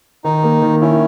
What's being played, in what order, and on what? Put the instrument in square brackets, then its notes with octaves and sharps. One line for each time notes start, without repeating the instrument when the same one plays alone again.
[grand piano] D#3 [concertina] D#4
[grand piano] A#3
D#3
[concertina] C#4 [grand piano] E4